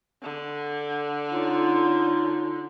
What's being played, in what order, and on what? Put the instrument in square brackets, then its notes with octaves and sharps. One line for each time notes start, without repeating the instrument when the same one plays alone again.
[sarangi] D3
[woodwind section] C#4 D#4 F4